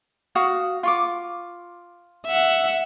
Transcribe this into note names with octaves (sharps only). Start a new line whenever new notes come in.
F#4 F5 D#6
F4 C#6 D6
E5 F#5